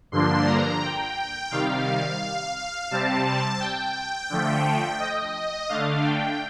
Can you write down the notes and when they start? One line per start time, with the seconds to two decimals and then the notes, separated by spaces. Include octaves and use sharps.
0.12 G2 D3 F3 A#3 D4 C6
0.47 A#5
0.82 G5
1.51 C3 D#3 G3 F5
2.56 F5
2.91 C3 G3 C4 A5
3.25 A5
3.60 G5
4.30 D3 F3 A3
5.00 D#5
5.69 D3 A3 D4 F5
6.04 G5